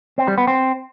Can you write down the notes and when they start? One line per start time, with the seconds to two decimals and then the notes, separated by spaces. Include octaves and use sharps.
0.18 C4
0.28 G3
0.38 B3
0.47 C4